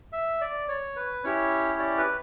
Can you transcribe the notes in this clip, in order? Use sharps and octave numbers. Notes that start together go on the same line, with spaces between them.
E5
D5
C#5
B4
C#4 E4 G4 C#5
D5
B4